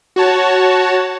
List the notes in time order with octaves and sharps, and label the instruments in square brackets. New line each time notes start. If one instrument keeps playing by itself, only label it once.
[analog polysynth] F#4 C#5 A5